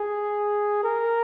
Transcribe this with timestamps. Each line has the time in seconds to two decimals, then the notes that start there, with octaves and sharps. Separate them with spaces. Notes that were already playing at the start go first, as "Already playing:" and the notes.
Already playing: G#4
0.84 A#4